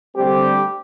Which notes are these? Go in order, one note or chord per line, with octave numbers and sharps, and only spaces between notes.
D3 G3 A3 C4 G4